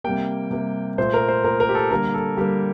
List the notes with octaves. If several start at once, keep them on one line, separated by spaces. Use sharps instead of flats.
C3 G3 A#3 G5
C3 G3 A#3
A#2 A3 C5
A#4
C5
A#2 A3 A#4
A#4
G4
A4
D3 G3 A#3 A#4
A4
D3 G3 A#3 G4